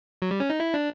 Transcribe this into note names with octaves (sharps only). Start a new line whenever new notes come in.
F#3
G3
C#4
D#4
E4
D4